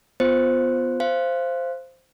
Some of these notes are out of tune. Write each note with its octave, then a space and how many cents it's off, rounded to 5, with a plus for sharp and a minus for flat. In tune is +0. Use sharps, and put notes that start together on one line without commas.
B3 +15 F4 +0 C5 +0
C5 +0 F5 -25